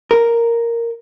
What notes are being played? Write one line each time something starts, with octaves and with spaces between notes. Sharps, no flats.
A#4